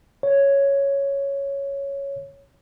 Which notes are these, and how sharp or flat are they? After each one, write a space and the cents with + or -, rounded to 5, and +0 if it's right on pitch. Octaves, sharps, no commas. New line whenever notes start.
C#5 +0